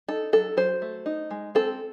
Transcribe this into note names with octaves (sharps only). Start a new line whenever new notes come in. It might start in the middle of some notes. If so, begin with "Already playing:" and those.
D#4 A4
F#3 A4
F#3 C5
A3
D#4
G#3
C4 A4